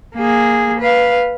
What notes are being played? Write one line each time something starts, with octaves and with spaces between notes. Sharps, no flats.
A#3 G#4
B4 F5